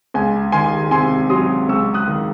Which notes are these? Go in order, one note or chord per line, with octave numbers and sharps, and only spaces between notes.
C#2 G#5
D#3 G#5 C6
C3 G#5 C6
F#3 C6 D#6
C#2 C#6 E6
D#6 F#6
D#3